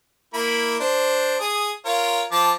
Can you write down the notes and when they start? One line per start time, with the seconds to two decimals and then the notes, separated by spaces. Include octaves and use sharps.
0.34 A#3 E4 B5
0.80 D4 C5
1.40 G#4 D#6
1.85 F4 A#4 C#5
2.32 F3 A5 D6